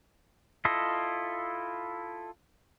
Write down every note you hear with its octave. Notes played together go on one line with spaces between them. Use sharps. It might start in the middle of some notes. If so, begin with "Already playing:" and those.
E4 F4 A4 D#5